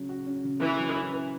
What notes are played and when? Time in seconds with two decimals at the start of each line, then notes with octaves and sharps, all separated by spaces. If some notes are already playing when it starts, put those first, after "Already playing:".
Already playing: C#3 F#3 C#4
0.09 F#4
0.26 C#4
0.44 C#3
0.60 E3 E4
0.79 F#3
0.95 C#4
1.13 B4